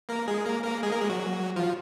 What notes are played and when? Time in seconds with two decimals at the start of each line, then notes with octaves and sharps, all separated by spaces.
0.09 A#3 A#4
0.28 G#3 G#4
0.45 A#3 A#4
0.64 A#3 A#4
0.83 G#3 G#4
0.92 A#3 A#4
1.01 G#3 G#4
1.09 F#3 F#4
1.56 F3 F4